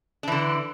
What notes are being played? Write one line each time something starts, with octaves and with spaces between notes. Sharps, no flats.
D3 E3 D4